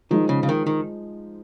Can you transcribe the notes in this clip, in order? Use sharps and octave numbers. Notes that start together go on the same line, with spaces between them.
D#3 F3 G#3 D#4
C#3
C#3
D#3
D#3